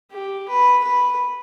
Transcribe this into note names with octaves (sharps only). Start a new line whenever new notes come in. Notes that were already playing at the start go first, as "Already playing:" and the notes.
G4
B4
B4